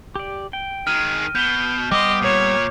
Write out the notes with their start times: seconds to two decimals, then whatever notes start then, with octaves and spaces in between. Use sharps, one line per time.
0.16 G4 D5
0.53 G5
0.87 D#3 G#3 F6 D#7
1.35 B2 G6 G7
1.92 G3 B3 G4 D#5 C6 D6 D#6
2.22 A#2 C#5